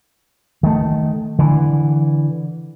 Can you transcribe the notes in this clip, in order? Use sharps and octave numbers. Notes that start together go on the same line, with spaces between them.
D#3 A3
D3 E3